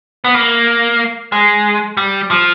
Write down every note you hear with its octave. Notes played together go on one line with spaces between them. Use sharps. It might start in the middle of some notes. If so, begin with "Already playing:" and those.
B3
A#3
G#3
G3
F3